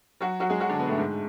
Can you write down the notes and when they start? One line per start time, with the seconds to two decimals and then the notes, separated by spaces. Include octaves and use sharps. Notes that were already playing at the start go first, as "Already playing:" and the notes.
0.21 F#3 F#4
0.40 F#3 F#4
0.50 G#3 G#4
0.60 F#3 F#4
0.69 D3 D4
0.79 B2 B3
0.88 A2 A3
0.98 G#2 G#3